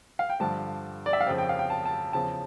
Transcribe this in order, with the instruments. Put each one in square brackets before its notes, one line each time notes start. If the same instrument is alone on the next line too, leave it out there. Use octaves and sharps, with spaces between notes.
[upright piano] F5
G5
G2 D3 F3 A5
D5
E5
F5
F2 C#3 F3 G5
G5
F5
G5
A5
A5
E2 C#3 F3 A5